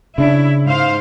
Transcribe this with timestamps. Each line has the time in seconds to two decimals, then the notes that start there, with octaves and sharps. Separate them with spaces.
0.18 C#3 D4 E4
0.64 G#2 C5 F5